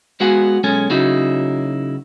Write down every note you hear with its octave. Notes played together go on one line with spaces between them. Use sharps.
G#3 B3 F#4 F5 F#5 G#5
B1 G#3 C#4 A4 G#5
C#3 F#3 A#3 D#4 E4 F#4